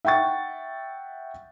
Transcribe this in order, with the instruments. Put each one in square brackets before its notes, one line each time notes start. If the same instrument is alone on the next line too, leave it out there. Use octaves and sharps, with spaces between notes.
[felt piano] E5 F#5 G5 C#6 A6